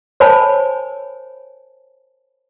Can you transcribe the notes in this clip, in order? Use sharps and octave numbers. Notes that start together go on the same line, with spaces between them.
A#4 C5 C#5 G#5 A5 B5